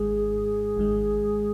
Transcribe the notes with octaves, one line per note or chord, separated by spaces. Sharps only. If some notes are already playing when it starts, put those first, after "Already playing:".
Already playing: G#1 G#2 G#3 G#4
G#1 G#2 G#3